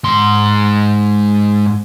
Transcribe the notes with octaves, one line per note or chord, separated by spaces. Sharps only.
G#2 C6